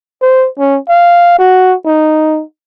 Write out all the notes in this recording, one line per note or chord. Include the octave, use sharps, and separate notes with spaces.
C5
C#4
F5
F#4
D#4